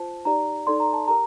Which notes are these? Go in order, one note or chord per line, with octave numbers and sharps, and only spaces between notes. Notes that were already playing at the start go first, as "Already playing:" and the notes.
Already playing: F4 C5 A5
D#4 G4 D5 A#5
D#4 A4 D5 C6
A#5
A5
G4 A#4 A#5